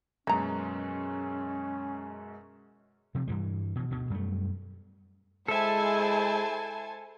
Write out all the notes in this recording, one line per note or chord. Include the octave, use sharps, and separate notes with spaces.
F#2 B2 G#3 A#3 C#4 A#5
C3 F3
G2 E3 G3
B2 E3
D2 B2
F#2 G3 A3
G#3 E4 A4 C5 E5 G#5 A5